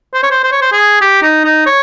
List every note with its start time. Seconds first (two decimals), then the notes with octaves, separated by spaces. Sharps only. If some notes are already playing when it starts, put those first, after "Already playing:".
0.14 C5
0.23 C#5
0.31 C5
0.43 C5
0.52 C#5
0.61 C5
0.72 G#4
1.01 G4
1.22 D#4
1.44 D#4
1.66 C#5